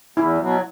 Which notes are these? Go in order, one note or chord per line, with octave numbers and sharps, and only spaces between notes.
E2 E4
B2 F#3